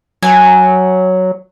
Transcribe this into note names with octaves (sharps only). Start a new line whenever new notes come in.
F#3 G#5